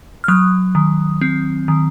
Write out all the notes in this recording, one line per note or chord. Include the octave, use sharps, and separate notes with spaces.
F6
F#3 D#6
D#3
C4
D#3